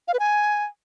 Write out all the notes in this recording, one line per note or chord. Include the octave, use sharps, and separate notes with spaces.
F5
B4
G#5